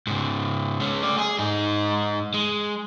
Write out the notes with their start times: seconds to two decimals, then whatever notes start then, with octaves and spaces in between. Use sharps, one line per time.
0.07 G#2 C#3
0.80 G#3 C#4
1.03 A3 D5
1.18 G#4
1.39 G#2 D#4
2.34 G#3